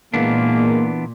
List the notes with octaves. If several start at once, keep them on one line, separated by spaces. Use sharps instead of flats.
A#2 E3 G#3 A#3 B3 D4